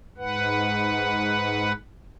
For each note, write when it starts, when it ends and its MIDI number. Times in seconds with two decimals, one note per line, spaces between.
0.18 1.72 44
0.18 1.72 71
0.18 1.72 78